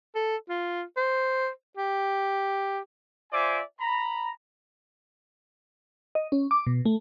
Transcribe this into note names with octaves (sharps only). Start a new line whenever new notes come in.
A4
F4
C5
G4
F4 C5 D5 E5 G#5 D6
A#5 B5
D#5
C#4
D6
B2
A3